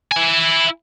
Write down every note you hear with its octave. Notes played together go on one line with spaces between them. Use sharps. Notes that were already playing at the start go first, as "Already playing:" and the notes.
E4 G#5